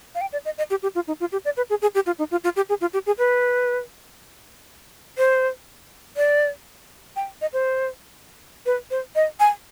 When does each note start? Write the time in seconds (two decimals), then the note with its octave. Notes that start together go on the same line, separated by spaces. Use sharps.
0.15 F5
0.21 G5
0.32 D5
0.45 D#5
0.58 D#5
0.70 G4
0.82 G4
0.95 F4
1.07 D#4
1.20 F4
1.32 G4
1.45 D5
1.57 B4
1.70 G#4
1.82 G#4
1.95 G4
2.06 F4
2.19 D#4
2.31 F4
2.44 F4
2.56 G4
2.69 G#4
2.81 F4
2.93 G4
3.06 G#4
3.18 B4
5.18 C5
6.17 D5
7.16 G5
7.41 D#5
7.53 C5
8.66 B4
8.91 C5
9.15 D#5
9.40 G#5